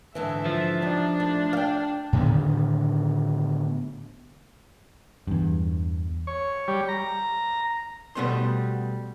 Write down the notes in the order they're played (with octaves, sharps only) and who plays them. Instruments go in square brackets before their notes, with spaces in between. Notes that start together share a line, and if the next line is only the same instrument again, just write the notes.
[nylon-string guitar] G#2 D3 E3 [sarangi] E5
[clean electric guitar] F3
[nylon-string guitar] G3 D#4 [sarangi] D4
[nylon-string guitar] A3
F5 G5
[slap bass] A2 D3 D#3 B3
[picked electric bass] E2 G2
[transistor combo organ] C#5
G3
A#5
[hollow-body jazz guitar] B2 G3 A3 B3 C5 C6